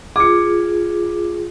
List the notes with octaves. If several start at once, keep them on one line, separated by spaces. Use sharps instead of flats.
F4 G#4 D6 C#7